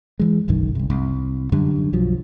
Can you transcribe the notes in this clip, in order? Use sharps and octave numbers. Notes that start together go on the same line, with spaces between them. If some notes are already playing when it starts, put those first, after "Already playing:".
E3 G#3
F#1 B1 F#2 D#3
F#1 C2
C2
F#2 D3 G3
B1 F3 F#3